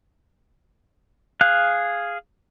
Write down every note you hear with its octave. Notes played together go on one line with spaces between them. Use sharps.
G#4 F5 F#6